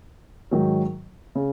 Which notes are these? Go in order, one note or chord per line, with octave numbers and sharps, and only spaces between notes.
G#2 D#3 F#3
C#3